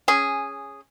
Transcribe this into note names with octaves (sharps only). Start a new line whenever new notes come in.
C#4 G#4